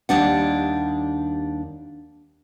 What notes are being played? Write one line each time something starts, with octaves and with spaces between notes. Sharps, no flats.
D#2 G3 D4 F#5